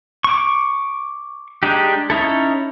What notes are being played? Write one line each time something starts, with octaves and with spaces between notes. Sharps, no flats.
C#6 D6
G#3 D4 D#4 G4
C#4 D#4 E4 A4